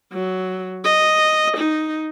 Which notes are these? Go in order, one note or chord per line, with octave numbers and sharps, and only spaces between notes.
F#3
D#5
D#4